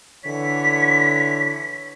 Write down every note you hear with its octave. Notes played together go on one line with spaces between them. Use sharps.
D3 E3 C#5 B6